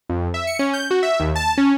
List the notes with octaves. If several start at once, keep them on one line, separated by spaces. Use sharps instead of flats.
F2
E5
C#7
C#4
G6
F#4
E5
D#2
A5
C#4